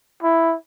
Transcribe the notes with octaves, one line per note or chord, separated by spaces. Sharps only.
E4